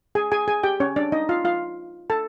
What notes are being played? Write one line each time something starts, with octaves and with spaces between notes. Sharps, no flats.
G#4 G#5
G#4 G#5
G#4 G#5
G4 G5
C#4 C#5
D4 D5
D#4 D#5
F4 F5
F4 F5
A4 A5